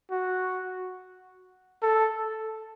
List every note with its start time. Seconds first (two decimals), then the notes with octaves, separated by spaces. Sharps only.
0.11 F#4
1.82 A4